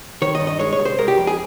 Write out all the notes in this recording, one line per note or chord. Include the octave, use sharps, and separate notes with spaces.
D#3 C#5
D#5
G2
D#5
G#3 C#5
C#5
C2
C5
G#3 A#4
G4
F2
G#4